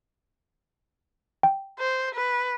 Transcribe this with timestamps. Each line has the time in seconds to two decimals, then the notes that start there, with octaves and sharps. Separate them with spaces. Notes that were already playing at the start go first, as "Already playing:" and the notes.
1.43 G5
1.79 C5
2.15 B4